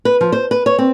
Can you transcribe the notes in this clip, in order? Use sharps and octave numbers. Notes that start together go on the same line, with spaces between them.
B4
F3
C5
B4
C#5
C4